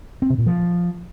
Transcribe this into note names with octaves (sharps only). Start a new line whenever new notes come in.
C4
C3
A#2
F3